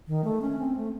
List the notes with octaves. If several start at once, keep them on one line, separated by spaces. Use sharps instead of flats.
D#3
A3
C#4
C4
A3